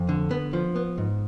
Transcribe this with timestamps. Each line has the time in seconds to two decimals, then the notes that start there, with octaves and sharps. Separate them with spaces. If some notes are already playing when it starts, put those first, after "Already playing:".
Already playing: F2
0.09 D3
0.31 B3
0.53 F3
0.76 B3
0.98 G#2